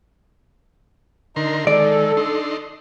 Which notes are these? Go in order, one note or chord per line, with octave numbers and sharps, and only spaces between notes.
D3 D#4 A#4 C6
D#3 G#3 A4 D5
D4 D#4 C6